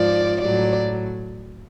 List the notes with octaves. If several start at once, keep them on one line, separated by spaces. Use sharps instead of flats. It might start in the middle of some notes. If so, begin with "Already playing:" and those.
Already playing: G#2 F3 D5
A2 F#3 D5